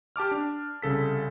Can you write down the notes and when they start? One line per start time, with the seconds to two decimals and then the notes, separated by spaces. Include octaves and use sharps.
0.16 G4 A5 D6 F6
0.31 D4
0.82 C2 C#3 A4 B6